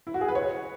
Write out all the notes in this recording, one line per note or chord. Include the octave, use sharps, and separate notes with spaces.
E4
F#4
G#4
B4
C#5